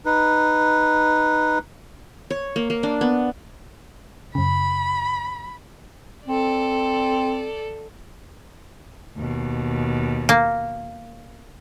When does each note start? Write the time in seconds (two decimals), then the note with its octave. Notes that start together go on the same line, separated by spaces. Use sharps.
0.05 D#4 B4
2.30 C#5
2.56 A#3
2.70 A#3
2.83 D4
3.01 B3
4.35 F#2 C#3 B5
6.27 C4 A4 D5
9.16 D#2 B2
10.29 A#3